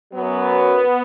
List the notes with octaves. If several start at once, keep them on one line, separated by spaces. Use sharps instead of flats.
F#2 F#3 B3